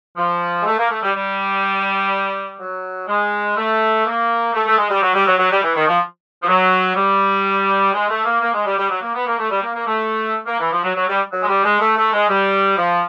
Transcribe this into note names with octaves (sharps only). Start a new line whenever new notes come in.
F3
G#3
A3
A#3
A3
G3
G3
F#3
G#3
A3
A#3
A3
A3
G#3
G3
F#3
G3
F#3
F#3
G3
E3
D#3
F3
F3
F#3
G3
G#3
A3
A#3
A#3
G#3
G3
G3
F#3
A#3
B3
A#3
A3
G3
A#3
A#3
A3
A#3
E3
F3
F#3
F#3
G3
F#3
G#3
G3
G#3
A3
A3
G#3
G3
F3